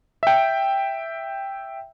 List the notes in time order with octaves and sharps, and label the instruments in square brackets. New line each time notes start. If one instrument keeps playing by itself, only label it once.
[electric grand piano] E5 G5